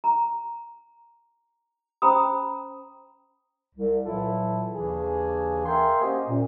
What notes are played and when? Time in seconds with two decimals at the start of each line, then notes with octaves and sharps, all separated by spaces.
0.04 A#5
2.02 C#4 C5 G5 A#5 B5 D#6
3.75 C2
4.05 A#2 E3 F#3 E4 F4 A4
4.74 D#2 C#3 E3 D4 G#4
5.66 A#4 E5 F5 G5 G#5 C6
6.02 A#3 C#4 F#4 G4 C5 D#5
6.28 F#2 A#2